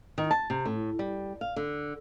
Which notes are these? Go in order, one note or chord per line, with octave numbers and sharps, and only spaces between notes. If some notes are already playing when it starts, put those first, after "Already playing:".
D#3
A5
C3
A2
G3
F5
D3